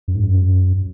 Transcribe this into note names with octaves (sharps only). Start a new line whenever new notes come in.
F#2
G#2
F#2